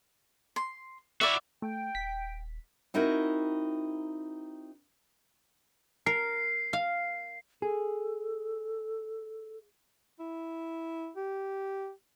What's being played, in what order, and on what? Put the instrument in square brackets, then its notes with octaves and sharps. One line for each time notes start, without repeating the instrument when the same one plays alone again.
[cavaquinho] C6
[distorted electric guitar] E4 F#4 [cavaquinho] D5 E5
[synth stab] A3 [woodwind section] G5
[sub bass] D#1 [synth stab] B6
[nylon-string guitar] C4 D#4 E4 F#4 A#4
[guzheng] A#4 [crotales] C7
[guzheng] F5
[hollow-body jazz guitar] G#4 [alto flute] A4
[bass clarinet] E4
G4